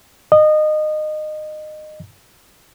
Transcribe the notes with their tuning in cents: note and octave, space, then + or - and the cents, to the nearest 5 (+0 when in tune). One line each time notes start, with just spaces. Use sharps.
D#5 -25